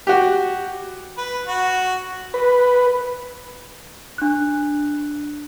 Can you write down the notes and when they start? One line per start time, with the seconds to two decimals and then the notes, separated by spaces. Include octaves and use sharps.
0.07 F#4 G4
1.18 B4
1.47 F#4
2.34 B4
4.18 D4 F#6